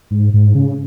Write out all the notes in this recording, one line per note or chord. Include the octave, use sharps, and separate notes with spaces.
G#2
G#2
C#3